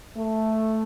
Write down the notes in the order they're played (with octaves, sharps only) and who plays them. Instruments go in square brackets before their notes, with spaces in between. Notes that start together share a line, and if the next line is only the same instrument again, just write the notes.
[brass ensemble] A3